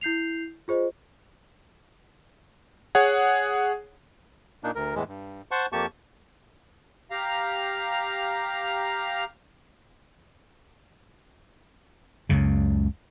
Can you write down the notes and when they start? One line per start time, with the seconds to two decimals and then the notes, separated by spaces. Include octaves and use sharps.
0.01 E4 G6 C7 F7
0.68 F4 G#4 C5 D#5
2.95 G#4 C#5 F#5
4.64 A#2 A#3 D4 D#4
4.75 D2 A#4
4.95 E2 A2 E3 G#3
5.08 G2
5.51 C5 F#5 A5 C6 C#6
5.72 F2 A#3 G4 A5 C#6
7.10 G4 F5 A#5
12.29 C#2 F#2 C#3